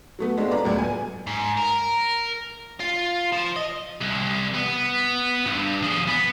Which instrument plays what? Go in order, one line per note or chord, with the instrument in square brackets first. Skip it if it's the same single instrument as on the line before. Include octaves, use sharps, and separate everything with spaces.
[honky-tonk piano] F#3 A3 B3
G#3 B3 C4 D4 F4 A4
B4 D5 A#5
C#2 F#2 A2
G#5
[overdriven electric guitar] G#2
A#4
F4
F3
D#5
[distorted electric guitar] C2
B3
G2
F3 G#4
B3